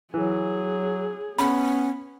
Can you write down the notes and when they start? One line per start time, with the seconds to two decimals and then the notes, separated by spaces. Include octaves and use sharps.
0.14 E3 F#3 G#4
1.39 B3 C#4 B5